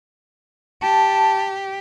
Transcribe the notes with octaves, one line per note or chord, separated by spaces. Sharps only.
G4 A5